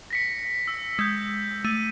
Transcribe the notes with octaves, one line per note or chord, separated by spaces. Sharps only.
A#6 B6 C#7
E6
G#3 E6 G6
A3 D#7